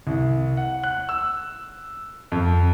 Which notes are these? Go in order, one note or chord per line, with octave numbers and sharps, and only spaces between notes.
C2
F#5
F#6
E6
F2